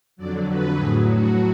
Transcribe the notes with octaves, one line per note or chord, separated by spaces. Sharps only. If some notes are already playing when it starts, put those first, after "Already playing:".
F2 D3 F#3 D5
B4
A2 F#3 G#4
F#4